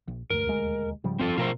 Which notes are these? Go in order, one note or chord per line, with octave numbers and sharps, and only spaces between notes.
A#1
E1 D2 G2 A3 A#4
D#2 G#3
G#2 C#3 F3 G3
F1 G2 C4 F4 A4
G#1 B2 F3 A3 F4 A#4 C5